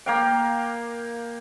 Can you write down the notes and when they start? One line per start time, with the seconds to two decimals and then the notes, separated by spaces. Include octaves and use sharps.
0.06 A#3 F5 G5